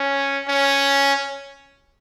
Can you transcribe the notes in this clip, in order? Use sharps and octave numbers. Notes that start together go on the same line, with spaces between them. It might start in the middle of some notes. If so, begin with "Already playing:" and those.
Already playing: C#4
C#4